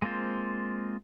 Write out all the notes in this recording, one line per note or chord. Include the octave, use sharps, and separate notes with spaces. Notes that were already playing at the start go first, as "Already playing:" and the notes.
G#3 A#3 C4 F4 C5